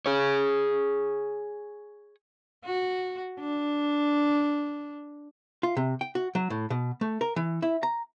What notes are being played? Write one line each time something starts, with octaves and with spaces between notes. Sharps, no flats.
G#4 C#5
F#4
D4
F4
C3
G5
F#4
F#3
A2
B2
A3
A#4
E3
E4
A#5